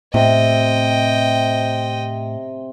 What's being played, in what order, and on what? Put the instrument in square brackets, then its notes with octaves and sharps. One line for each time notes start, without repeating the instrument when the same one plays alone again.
[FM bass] A2 [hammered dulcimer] C3 [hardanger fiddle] D#5 G5